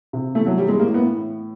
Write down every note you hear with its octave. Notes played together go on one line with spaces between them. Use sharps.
C3
E3 A3
F#3
E3 G3
G#3
A2 A#3
B3
A2